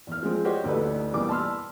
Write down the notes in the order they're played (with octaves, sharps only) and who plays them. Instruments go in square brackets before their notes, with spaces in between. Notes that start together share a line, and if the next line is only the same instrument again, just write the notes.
[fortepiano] E2 F6
F3 G#3 C4
D4 F#4 G4 C5 C#5 D#5
A1 D2 D4 D#4 A4 B4
E2 B2 E3 G3 A#3 D6
A5 B5 C6 E6 F6